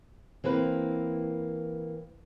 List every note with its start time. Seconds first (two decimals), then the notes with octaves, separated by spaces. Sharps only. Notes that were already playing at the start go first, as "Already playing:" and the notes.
0.44 E3 A#3 C4 B4